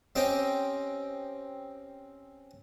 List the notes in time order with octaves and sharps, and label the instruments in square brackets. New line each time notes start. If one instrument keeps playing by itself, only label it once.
[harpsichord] C4 C#4 G4 D#5 D6